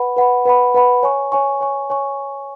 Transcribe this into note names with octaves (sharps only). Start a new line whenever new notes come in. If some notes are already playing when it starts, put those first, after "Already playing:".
Already playing: B4 F#5 B5
B4 F#5 B5
B4 F#5 B5
B4 F#5 B5
C#5 G#5 C#6
C#5 G#5 C#6
C#5 G#5 C#6
C#5 G#5 C#6